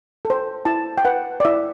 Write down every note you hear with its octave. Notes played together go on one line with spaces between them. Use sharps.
A4
C5
E4 A5
G5
B4 F#5
D5
E4 E5